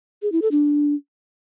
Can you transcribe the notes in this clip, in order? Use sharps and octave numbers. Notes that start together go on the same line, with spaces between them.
G#4
E4
A4
D4